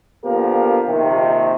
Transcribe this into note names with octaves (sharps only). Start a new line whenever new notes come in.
D3 F3 A#3 B3 G4 A#4
A#1 C3 D#3